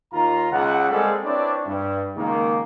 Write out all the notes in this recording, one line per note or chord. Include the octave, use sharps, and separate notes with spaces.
D#2 F4 A#5
C#2 F#5
G3 G#3 A#3 C4 G#4 A4
C4 D4 E4 B4 C#5 D5
G2
C#2 D#3 G#3 A#3